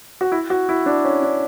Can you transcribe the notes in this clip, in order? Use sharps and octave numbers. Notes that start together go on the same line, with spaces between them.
F#4
E4
F#4
E4
D4
C#4
D4